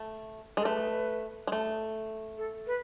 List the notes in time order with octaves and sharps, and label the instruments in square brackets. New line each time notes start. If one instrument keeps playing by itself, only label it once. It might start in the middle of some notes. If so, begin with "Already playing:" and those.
Already playing: [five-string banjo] A3
G#3
[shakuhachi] A4
[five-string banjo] A3 [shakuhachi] B4
[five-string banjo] G#3
A3
[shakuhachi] A4
B4